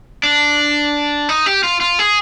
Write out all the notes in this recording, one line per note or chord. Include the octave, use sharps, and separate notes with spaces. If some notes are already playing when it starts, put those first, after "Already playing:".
D4
D#4
G4
F4
F4
G#4